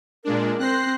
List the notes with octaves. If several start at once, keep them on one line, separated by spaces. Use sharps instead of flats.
A#2 G#3 D4 A#4
C4 C5 F#6 A#6 C7